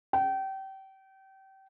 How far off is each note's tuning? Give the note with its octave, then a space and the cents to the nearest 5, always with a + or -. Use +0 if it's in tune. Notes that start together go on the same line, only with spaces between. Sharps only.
G5 -30